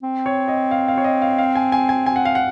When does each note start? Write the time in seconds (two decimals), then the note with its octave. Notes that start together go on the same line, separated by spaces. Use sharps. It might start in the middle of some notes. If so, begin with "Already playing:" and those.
0.03 C4
0.26 C#5
0.48 D#5
0.71 F5
0.88 F5
0.98 C#5
1.04 D#5
1.22 F5
1.38 F5
1.55 G#5
1.72 G#5
1.89 G#5
2.06 G#5
2.16 F#5
2.25 F5
2.35 F#5